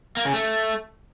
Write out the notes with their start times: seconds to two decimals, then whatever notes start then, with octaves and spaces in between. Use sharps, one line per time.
0.17 A#3
0.25 C#3
0.34 A3